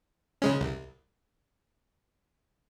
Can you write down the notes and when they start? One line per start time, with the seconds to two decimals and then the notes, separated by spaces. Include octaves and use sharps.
0.42 C#3 G#3 C#4
0.61 C2